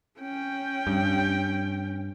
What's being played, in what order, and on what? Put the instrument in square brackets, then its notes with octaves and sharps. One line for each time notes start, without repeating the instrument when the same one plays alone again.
[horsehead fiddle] C#4 G5
[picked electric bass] G2